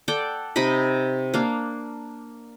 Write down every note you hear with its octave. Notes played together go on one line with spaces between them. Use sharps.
A4 D5 F#5 G5
C3 D#4 D#5 B5
A#3 D4 F5